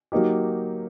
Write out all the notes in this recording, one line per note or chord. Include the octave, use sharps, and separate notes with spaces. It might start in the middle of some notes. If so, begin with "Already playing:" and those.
F#3 A#3 D#4 G4